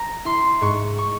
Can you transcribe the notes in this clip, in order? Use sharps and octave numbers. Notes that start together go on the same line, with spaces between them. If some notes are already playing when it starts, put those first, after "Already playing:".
Already playing: A#5
E4 C6
G#2 C#6
C#6